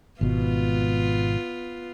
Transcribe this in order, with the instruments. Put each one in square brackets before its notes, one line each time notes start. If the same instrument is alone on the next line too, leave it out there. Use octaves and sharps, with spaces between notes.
[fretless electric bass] G#1 B2 [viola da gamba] B3 F4